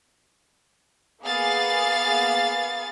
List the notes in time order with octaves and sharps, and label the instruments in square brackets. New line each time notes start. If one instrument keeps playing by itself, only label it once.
[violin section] A#3 B3 G#4 F5 A6